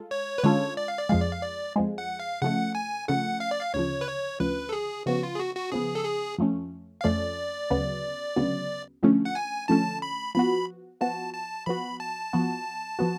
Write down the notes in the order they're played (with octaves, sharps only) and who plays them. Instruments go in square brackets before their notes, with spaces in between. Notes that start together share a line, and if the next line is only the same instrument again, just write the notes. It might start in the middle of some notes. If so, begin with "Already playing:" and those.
Already playing: [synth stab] G#3 F4 A4
[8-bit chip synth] C#5
B4
[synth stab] D3 G#3 C#4 F4 A4 [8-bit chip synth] C#5
[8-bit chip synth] D5
F5
D5
[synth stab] F2 F3 G#3 [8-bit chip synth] F5
[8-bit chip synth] D5
F5
D5
[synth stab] F2 F3 G#3
[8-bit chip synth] F#5
F5
[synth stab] C#3 F3 A3 [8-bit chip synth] F#5
[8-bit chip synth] G#5
[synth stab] C#3 F3 A3 [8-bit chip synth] F#5
[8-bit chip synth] F5
D5
F5
[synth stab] D2 C#3 F3 [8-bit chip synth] C#5
[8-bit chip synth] B4
C#5
[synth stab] D2 C#3 F3 [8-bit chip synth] B4
[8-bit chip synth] A4
G#4
[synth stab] C#3 F3 B3 [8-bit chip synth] F#4
[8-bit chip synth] F4
G#4
F#4
F#4
[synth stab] C#3 F3 B3 [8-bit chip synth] G#4
[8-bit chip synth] A4
G#4
[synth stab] F2 F3 A3 C#4
[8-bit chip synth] F5
[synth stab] F2 F3 A3 C#4 [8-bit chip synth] D5
[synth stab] D2 C#3 F#3 B3
D2 C#3 F#3 B3
D3 F3 A3 C#4
[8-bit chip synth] F#5
G#5
[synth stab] D3 F3 A3 C#4 [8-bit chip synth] A5
[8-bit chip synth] B5
[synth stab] F3 B3 F#4 [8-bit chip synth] B5
[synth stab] F3 B3 F#4 [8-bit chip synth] A5
[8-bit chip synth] A5
[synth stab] F3 B3 F#4 [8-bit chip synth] B5
[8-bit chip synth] A5
[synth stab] F3 B3 F#4
F3 B3 F#4